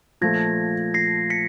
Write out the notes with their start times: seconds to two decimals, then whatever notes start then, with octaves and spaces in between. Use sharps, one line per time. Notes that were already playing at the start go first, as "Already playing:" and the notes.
0.21 A#2 F3 A3 G#6 A#6
0.94 A#6 C7
1.30 B6 C#7